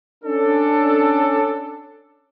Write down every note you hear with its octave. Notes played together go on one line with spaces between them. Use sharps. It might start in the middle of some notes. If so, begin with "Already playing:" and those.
C#4 D4 A4